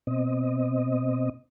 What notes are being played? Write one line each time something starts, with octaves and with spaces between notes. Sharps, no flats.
B2 C4 D#5